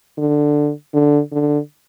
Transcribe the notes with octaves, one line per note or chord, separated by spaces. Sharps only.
D3
D3
D3